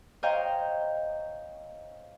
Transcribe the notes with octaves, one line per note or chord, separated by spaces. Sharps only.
C5 C#5 D#5 F5 G5 A#5